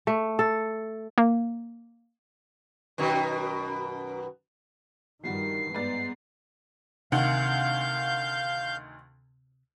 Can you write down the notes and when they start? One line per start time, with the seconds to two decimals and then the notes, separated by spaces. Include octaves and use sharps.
0.07 A3
0.39 A4
1.18 A#3
2.98 F#2 B2 D#3
5.24 G2 D#3 F3 G3 F#4 C7
5.75 G#2 B3 D5 A6
7.12 D2 C3 D#3 F5 F#5 G6